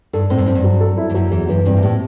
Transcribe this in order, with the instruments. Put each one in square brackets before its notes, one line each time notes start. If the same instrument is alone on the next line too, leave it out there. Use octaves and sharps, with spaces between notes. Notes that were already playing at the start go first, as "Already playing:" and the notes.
[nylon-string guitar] G2 [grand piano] A4
[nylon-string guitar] A2 [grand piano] C4
[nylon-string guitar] G2
[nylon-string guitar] F#2 [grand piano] C4
[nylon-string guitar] G2
[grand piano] F#3
A4
E4
[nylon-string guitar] E2
[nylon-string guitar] F#2 [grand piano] F#3
[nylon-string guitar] E2 [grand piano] F#3
[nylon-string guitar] F#2 [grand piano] E3
[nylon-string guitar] G2 [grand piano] C3
[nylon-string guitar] B2
[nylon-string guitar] A2 [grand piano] G3